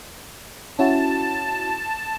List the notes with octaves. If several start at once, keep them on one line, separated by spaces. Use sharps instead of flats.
C#4 E4 F#4 A5